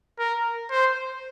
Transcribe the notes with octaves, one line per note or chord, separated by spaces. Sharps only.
A#4
C5